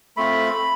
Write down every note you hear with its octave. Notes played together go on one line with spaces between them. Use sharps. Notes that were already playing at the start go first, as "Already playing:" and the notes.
A3 C4 F4 B5